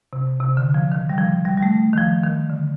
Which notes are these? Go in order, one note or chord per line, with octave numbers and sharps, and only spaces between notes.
C3
C3
D3
F3
D#3
G3
F3
G3
G3
A3
D#3
F3
D#3
D3